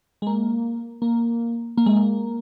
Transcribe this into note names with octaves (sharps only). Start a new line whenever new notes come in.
G#3
A#3
A#3
A#3
G#3
A#3